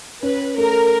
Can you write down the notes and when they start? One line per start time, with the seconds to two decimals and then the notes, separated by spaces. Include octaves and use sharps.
0.23 C#4 B4
0.58 A3 A#4